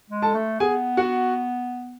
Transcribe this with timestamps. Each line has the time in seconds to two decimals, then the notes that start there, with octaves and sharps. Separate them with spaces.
0.10 G#3
0.22 A4 A5
0.34 A3
0.60 B3 G#4 G#5
0.97 F#4 F#5